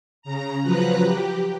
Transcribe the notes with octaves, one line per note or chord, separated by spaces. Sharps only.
C#3 A#5
F3 F#3 B4 A#5 F#6
G4